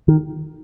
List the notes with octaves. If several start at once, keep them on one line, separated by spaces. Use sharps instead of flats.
D#3